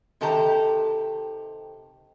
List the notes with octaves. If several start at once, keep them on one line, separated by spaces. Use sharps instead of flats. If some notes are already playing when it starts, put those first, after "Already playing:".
C3 D#3 G4 A4 A5 A#5